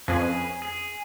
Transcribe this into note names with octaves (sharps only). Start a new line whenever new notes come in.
F2 C#4 G#4 B4
G#4